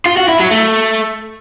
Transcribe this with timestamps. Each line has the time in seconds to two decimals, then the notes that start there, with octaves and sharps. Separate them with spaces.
0.06 F4
0.17 F#4
0.28 E4
0.40 F#3
0.51 A3